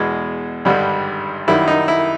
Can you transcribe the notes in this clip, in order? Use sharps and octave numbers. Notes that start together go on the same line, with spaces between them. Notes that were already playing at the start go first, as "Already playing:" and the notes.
Already playing: E2 B2 G#3
G#1 G2 D3 G3
F#2 D#3 G3 E4
D#4
E4